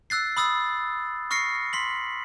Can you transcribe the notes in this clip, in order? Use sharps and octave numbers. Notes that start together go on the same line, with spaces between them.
E6 F#6 A6 C7
B5 D#6 E6 A6
C#6 F6 A#6 C7 C#7
C6 B6 F#7